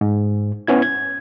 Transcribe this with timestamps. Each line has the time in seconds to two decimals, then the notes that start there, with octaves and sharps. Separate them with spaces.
0.01 G#2
0.67 B3 C#4 E4 G#6
0.82 G#6